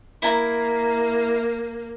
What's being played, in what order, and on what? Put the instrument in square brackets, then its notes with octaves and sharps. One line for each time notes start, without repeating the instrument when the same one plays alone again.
[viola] A#3 [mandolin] E4 A#5